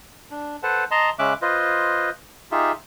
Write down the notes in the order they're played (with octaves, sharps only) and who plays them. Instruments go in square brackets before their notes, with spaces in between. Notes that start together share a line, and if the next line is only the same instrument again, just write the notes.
[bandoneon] D4
A4 B4 C5 F#5 A5
D#5 A5 A#5 C6
C#3 G#3 C#4 E5 D6 F#6
F4 B4 C5 D#5
D#4 F4 G4 G#4 E5